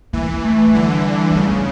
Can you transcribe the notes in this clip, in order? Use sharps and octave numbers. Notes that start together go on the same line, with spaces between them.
E3 A#3
A#3
A3
F3
D3 G3
A3
C#3 G3
F3